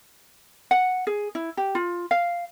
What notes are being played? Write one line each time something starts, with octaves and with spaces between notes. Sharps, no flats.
F#5
G#4
E4
G4
F4
F5